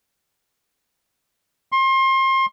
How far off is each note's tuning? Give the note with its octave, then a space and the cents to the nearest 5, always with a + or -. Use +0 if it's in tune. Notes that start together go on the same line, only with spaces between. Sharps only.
C6 +30